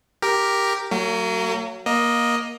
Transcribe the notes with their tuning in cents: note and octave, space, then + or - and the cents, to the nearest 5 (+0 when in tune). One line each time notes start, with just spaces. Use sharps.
G4 +0 A#4 +0
F#3 +10 A#3 -45
A#3 +20 D#5 +0